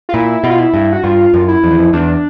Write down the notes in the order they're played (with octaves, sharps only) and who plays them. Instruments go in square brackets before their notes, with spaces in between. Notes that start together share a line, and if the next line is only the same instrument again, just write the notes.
[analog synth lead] F4
[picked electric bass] A#2 [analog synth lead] E4
[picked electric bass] B2
[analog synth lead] F4
E4
[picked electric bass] G2
[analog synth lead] F#4
[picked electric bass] G2 [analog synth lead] F4
[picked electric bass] F#2
[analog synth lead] E4
[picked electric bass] F2
E2
F2
[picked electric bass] E2 [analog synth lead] D4